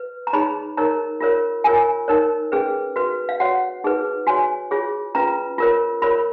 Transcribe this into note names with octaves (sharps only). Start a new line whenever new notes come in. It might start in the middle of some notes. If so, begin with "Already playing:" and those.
Already playing: B4
A#5
D#4 G#4 C#5 B5
D#4 A#4 C#5 A#5
F4 A#4 C#5
F4 A#4 C#5 G#5
D#4 A#4 C#5
C#4 G#4 B4
F#4 B4
F5
F#4 C#5 F#5
D#4 G#4 B4
F#4 C#5 G#5
F4 G#4 C#5
C#4 F4 B4 A#5
F4 A#4 C#5
F4 A#4 C#5 B5